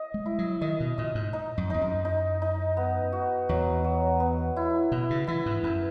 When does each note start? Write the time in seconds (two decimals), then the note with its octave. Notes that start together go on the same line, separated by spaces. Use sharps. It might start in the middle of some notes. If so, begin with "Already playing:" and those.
Already playing: D#5
0.14 G#3
0.26 E4
0.39 F#3
0.61 D#3 D#5
0.80 B2
0.98 A#2 D#5
1.15 G#2
1.33 D#4
1.58 F#2
1.70 E2 D#4
1.81 F#2
2.05 D#4
2.42 D#4
2.77 B3
3.12 F#4
3.49 E2 F#3
3.84 F#3
4.20 B3
4.56 E4
4.92 B2 E4
5.10 C#3
5.27 E3 E4
5.46 G#2
5.63 F#2 B4